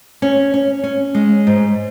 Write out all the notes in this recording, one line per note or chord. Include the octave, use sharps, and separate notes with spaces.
C#4
C#4
C#4
G#3
G#2